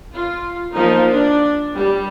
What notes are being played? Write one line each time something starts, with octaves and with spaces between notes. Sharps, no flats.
F4
F3 A#3 D#4
D4
G3